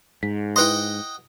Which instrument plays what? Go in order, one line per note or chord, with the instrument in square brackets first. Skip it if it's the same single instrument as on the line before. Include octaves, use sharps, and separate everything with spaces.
[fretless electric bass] G#2 [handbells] B6
[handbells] E4 B4 C6 [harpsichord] D#5 F#5 G5